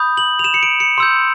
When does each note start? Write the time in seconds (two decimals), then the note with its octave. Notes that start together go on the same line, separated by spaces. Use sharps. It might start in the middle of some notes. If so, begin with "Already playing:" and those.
Already playing: B5 D#6 G6
0.17 F#7
0.39 F7
0.44 E7
0.54 C#7
0.63 D7
0.80 C#7
0.98 C6 E6 G6